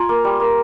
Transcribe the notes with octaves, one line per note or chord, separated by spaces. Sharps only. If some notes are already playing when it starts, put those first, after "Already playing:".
Already playing: F4 G#5 A#5
A#3
G3
A#3